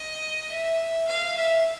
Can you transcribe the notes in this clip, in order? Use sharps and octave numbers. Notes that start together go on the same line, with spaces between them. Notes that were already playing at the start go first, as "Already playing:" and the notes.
Already playing: D#5
E5
F5
E5